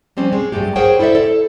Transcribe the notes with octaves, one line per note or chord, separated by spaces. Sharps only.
F3 G3 C4 C#4
G#3
G2 F#3 G#3 A3 G4
G#4 A#4 C5 C#5 F#5 G5
E4 A4 C5 D5 E5
A4